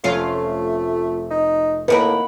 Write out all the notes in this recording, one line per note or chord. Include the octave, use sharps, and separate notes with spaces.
F1 A3 C#4 F4 C7
D#4
D#2 A2 G4 A#4 B4 F#5 B5